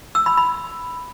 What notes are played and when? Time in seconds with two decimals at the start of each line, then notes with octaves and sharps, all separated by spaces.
0.15 E6
0.26 B5
0.37 B5